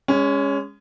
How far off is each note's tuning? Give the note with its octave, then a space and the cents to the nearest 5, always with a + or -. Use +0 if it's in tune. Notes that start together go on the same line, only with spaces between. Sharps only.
G#3 -20 C#4 +10